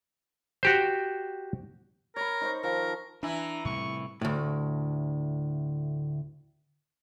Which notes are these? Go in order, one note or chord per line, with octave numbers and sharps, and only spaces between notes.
F#4 G4 C5
A#4 C#5 B5
D#4 C5 C#6
D#3 F3 A4 A#4
E3 D4 E4 A#5
A2 C3 G3 C#6
D2 A2